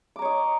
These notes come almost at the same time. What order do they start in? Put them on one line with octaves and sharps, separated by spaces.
D6 A#5 C#5 D#5